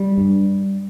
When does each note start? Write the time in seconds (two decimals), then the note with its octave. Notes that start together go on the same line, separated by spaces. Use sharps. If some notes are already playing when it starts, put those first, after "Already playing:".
Already playing: G3
0.18 G2